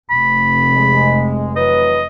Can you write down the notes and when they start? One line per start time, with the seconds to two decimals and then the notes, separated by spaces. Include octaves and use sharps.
0.10 F1 B5
0.73 G#3
1.56 E3 F#3 B4 D#5